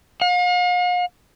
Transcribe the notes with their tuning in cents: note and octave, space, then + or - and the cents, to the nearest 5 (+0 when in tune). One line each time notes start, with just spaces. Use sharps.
F5 +45